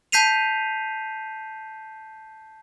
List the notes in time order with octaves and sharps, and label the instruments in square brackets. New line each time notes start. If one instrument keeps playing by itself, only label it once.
[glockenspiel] A5 G6 B6 C7 D#7 F7